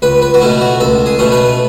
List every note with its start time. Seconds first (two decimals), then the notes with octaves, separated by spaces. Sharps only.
0.02 C#2 B4
0.22 B4
0.34 F#4
0.41 B2 A3 C#4 E4
0.61 F#4
0.80 C#2 A4
1.06 G#4
1.19 B2 A3 C#4
1.32 B4